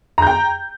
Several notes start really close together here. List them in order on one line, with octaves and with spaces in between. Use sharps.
A#5 G6 G5